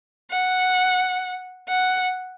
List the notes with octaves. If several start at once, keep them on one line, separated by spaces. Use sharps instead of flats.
F#5
F#5